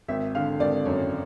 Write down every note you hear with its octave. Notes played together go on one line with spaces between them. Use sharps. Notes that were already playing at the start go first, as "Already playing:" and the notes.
G#1 E5
D3 F5
G#1 D5
F#2 C#5